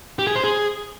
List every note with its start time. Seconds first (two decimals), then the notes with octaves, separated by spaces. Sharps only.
0.19 G4
0.27 G#4
0.35 C5
0.44 G#4